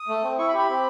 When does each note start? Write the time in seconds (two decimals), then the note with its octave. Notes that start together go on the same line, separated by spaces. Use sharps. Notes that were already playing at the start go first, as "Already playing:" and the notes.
Already playing: D#6
0.08 A3
0.23 C4
0.38 E4 C#6
0.48 B5
0.53 G4
0.59 B5
0.69 C4